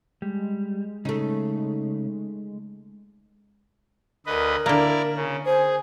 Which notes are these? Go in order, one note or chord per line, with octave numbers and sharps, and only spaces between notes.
G3 G#3
C#3 A3 D#4
D2 A#4 B4 D#5
D3 A#3 E4 D5 A#5
C#3
G#4 C5 G#5